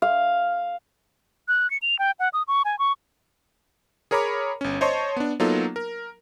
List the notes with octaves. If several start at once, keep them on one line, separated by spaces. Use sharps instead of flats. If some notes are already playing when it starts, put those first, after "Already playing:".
F5
F#6
C#7
F7
G5
F#5
D#6
C#6
G#5
C#6
G#4 A#4 C#5 A#5 B5 D6
G1 C#4
C5 C#5 D#5 A5 C6 C#6
B3 D4
F#3 A#3 B3 D#4 F4 A4
A#4